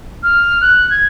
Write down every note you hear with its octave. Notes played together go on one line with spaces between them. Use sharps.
F6
F#6
G#6